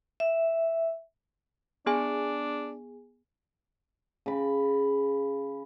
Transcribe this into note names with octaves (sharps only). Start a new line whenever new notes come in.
E5
B3 D4 G#4 G#5
C#3 B5